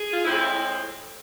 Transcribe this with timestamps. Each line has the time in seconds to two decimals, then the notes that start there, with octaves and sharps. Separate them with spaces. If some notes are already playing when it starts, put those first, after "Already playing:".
Already playing: G#4
0.14 F4
0.25 A2 G#3 C4 E4
0.39 E4